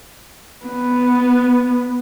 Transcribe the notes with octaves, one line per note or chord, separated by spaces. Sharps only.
B3